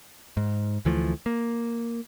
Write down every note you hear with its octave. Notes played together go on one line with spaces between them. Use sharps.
G#2
D2 E3 F3 A3
A#3